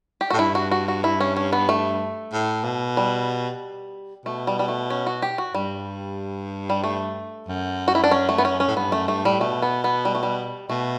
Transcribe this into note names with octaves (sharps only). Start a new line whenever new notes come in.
G4
F#4
A2
G2 E4
F#4
F#4
F#4
E4
C#4
C#4
B3
A3
A2
B2
G3
B2 A3
G3
G3
A3
C#4
F#4
G4
F#4
G2 G3
G3
A3
F#2
F#4
E4
D4
C#4
A3
B3
C#4
C#4
A2
G2 B3
F#2 A3
G2 A3
A2 G3
B2 A3
B3
B3
G3
A3
G3
B2 A3